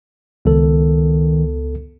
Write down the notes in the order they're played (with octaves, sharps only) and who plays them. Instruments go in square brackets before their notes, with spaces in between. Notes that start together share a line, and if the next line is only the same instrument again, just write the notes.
[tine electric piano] C#2 B3 A4 [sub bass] D#3